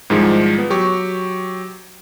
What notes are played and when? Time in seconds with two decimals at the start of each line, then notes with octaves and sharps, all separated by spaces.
0.10 G#2 D#3 F3 G3 G#3 E4
0.58 B3
0.70 F#3 G4 C#6